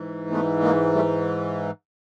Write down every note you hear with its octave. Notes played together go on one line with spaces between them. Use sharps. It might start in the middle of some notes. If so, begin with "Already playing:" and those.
Already playing: G#2 E3
A3 B3
G#3 A#3
G3 A3